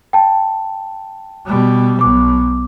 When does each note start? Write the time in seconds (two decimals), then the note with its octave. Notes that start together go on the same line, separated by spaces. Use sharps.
0.13 G5 A5
1.46 B2 G3
2.01 B1 B2 D6